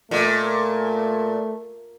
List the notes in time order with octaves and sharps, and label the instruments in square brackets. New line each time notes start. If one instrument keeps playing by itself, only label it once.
[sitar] A#2 [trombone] A3